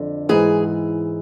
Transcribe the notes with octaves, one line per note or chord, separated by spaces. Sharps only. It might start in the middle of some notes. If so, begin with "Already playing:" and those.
Already playing: F2 D3
G#2 E3 G#4